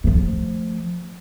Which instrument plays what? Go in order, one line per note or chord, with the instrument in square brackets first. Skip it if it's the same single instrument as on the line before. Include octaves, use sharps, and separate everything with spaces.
[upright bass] F3 A3